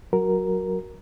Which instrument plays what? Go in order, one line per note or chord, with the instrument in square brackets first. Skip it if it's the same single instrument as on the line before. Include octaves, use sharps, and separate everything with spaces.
[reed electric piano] F#3 F#4 A#4